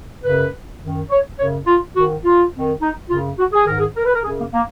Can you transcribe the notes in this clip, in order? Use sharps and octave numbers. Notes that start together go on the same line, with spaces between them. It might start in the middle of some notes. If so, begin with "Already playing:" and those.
F#2 C#3 B4
F#2 D#3
C#5
F#2 C#3 C#5
F4
G#2 D#3 F#4
F4
F2 D#3
D#4
F#2 C#3 F4
F#4
G#4
G#2 D#3 A#4
G#4
A#4
B4
A#4
F#2 C#3 G#4
A#3
A#3